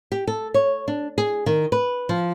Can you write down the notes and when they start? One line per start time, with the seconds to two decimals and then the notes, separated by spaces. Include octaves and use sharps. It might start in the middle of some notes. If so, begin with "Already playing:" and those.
0.12 G4
0.27 A4
0.54 C#5
0.88 D4
1.18 G#4
1.46 D#3
1.72 B4
2.09 F3